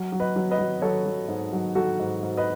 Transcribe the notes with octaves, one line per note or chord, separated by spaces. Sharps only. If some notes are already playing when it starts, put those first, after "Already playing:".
Already playing: F#3
F#3
B4 D#5
F#3
B4 D#5
F#3
F#3 A4 C#5
F#3
G#2
F#3
F#3 F#4 A4
G#2
G#2
B4 D#5